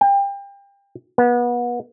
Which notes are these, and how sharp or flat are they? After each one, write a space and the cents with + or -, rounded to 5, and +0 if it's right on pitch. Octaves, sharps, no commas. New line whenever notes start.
G5 +30
B3 -30